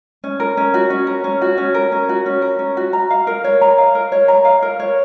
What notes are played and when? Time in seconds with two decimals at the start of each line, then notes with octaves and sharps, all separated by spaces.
0.24 C#4
0.40 A#4
0.57 C#4
0.74 F#4
0.90 C#4
1.07 A#4
1.24 C#4
1.42 F#4
1.58 C#4
1.74 A#4
1.92 C#4
2.09 F#4
2.26 C#4
2.42 A#4
2.59 C#4
2.77 F#4
2.93 A#5
3.10 F5
3.27 A#4
3.44 C#5
3.61 A#5
3.78 F5
3.95 A#4
4.12 C#5
4.28 A#5
4.45 F5
4.62 A#4
4.80 C#5